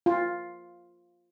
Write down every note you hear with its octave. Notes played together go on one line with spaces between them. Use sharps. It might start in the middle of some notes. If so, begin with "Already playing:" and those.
F4